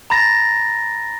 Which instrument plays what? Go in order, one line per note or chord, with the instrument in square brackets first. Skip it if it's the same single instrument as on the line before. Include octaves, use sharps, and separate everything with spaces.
[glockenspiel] A#5 B5 A6 A#6